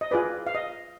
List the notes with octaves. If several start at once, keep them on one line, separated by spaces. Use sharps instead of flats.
D#5
F4 G#4 B4 D5
F5
D#5